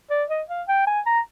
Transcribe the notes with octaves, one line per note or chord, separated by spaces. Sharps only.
D5
D#5
F5
G5
G#5
A#5